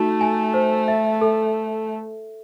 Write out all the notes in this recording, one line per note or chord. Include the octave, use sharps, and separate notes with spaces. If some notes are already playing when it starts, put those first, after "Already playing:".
Already playing: A3 D#4 F#4
G#5
C5
E5
A4